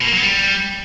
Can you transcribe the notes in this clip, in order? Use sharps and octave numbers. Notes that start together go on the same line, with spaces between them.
B2
A#3
F#3
B3
G3